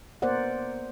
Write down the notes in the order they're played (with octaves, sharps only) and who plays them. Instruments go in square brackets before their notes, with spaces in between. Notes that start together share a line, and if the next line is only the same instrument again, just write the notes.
[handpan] A#3 B3 A#4 C5 D5 F#5